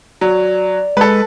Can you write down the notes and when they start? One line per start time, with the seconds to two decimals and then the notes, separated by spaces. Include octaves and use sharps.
0.21 F#3 D5
0.97 G#3 A4 B4